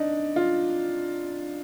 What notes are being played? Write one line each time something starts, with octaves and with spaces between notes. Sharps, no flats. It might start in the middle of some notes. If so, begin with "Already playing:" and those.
Already playing: D4 D#4
F4